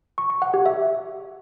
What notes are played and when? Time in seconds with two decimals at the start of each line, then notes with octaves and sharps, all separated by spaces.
0.18 C#6
0.30 C#6
0.42 F#5
0.54 G4
0.66 E5